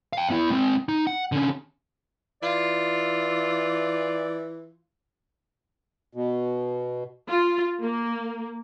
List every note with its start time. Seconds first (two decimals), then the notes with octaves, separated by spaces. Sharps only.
0.13 F5 G5
0.30 B3 E4
0.50 G#3 C4
0.89 D#4
1.07 F#5
1.32 D3 C#4
2.42 E3 F4 D5
6.15 B2
7.28 F4
7.81 A#3